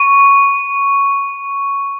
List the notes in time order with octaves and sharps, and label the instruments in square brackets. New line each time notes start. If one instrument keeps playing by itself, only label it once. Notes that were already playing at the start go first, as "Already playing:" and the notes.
Already playing: [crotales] C#6